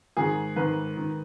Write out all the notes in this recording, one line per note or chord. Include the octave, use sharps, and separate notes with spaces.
G#2 D#3 G#4
G#2 D#3 B4
D#3